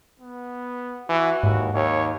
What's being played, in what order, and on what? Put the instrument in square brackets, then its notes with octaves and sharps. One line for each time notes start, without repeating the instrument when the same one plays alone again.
[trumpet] B3
[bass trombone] E3 [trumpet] F#4
[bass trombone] D#2 [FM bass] G#2
[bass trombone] D#2 [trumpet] C#5